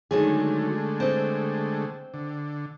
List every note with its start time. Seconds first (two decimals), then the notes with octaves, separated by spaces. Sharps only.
0.11 D3 D#3 F#3 G#3 A3 G#4
1.00 C4 D#5
2.14 D3